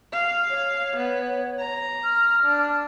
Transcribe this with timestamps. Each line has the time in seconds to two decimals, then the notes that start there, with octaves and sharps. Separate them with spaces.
0.13 F5
0.50 C#5
0.96 B3
1.60 A#5
2.04 F6
2.43 D4